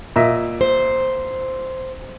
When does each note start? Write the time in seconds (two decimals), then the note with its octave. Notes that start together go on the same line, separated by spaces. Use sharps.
0.16 A#2 D#5 E5
0.61 C5